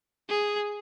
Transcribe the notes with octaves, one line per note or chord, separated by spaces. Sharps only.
G#4